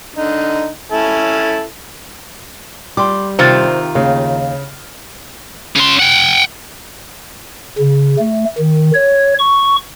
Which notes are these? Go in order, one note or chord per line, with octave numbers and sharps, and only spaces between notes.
D3 D#4
C#4 E4 A4
G3 C6 D6
C3 D#3 F4 C5
D#2 C#3 F5
C#3 C6
F#5 G5
C#3
A3
D#3
C#5
C#6